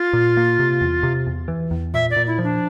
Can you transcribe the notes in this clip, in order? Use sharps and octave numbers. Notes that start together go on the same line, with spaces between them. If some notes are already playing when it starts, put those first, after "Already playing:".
Already playing: F4
A#2
A#3
C3
E2
C3
E2
E3
E2
A#2 E5
D5
A#2
E4
F3 D4